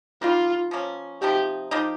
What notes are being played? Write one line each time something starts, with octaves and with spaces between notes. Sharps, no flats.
D#3 G3 A#3 F4
F3 A#3 C#4
C3 F3 C4 D#4 G4
F3 A#3 D#4 G4